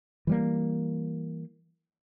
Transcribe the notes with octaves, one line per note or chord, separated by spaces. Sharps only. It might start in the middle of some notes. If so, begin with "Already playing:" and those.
E3 G3 A#3